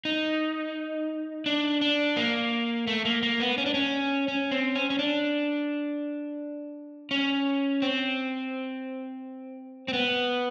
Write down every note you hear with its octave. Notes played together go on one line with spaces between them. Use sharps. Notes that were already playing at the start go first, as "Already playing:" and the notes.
D#4
D4
D4
A#3
A3
A#3
A#3
B3
C#4
D4
C#4
C#4
C4
C#4
C#4
D4
C#4
C4
C4
B3